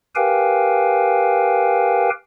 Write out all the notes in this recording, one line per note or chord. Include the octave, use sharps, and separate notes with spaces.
G4 A#4 B4 F5 G5 G#5